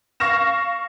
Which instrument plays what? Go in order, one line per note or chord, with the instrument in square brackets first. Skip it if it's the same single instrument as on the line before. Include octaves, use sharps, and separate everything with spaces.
[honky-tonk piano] F5 C#6 F6 A#6 E7